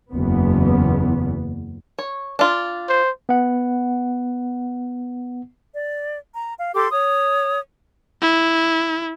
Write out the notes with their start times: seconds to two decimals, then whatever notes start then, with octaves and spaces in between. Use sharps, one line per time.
0.11 F#1 E2 B3
1.99 C#5
2.39 D4 F4
2.89 C5
3.29 B3 F#5
5.74 D5
6.34 A#5
6.56 F5
6.74 G4 A4 C6 D6
6.91 C#5 D#6
8.22 E4